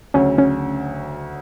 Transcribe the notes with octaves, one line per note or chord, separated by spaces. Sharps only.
D2 C#3 F#3 C#4
C#4